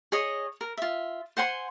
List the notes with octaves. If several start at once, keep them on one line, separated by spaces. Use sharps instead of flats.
G#4 C#5 D#5
A#4
F4 E5
C5 F#5 G#5 C6